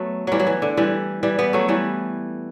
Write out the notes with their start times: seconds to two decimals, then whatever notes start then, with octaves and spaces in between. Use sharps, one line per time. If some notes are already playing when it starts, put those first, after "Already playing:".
Already playing: F#3 A3 B3
0.27 E3 F#3 G3
0.40 F#3
0.47 E3
0.62 D3
0.77 E3 G3
1.23 E3 G3
1.39 G3 B3
1.53 F#3 A3
1.68 E3 G3